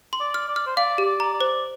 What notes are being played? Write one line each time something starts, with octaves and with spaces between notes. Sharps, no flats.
C6
D5
F6
D5
F6
C5
D5 F5
G4
D5
A#5
D5
C5